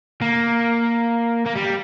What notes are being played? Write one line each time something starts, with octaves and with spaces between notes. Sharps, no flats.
A#3
A#3
G3